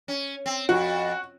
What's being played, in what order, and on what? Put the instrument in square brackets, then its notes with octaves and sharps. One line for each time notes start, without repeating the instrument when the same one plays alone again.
[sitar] C#4
C4
[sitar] F2 [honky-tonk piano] F#4